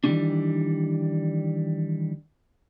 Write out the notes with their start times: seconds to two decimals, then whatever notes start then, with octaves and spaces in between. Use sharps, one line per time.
0.04 D#3 E3 F#3 G3 C#4 D4